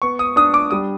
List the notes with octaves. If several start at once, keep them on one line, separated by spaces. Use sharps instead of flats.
B3 C#6
D#6
D4 D#6
D6
G3 D#6